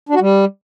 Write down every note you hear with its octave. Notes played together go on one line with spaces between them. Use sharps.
D4
F#4
G3